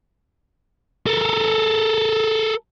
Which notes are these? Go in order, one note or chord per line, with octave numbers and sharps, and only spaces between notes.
A4 A#4